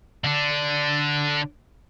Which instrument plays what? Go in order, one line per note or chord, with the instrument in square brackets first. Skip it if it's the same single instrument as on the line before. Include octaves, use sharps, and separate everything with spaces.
[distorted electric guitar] D3 D4